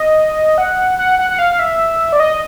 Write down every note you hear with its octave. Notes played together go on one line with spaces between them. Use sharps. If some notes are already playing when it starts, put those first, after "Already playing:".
Already playing: D#5
F#5
F#5
F#5
F#5
F5
E5
D5
D#5